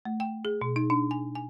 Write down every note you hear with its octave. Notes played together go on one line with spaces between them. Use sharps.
A3
G5
G#4
B2
D#4
D4
G#5
G#5